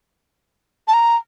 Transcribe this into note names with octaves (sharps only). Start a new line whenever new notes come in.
A5
A#5